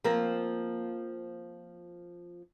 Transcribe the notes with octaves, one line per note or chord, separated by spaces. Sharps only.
F3 A#3 C4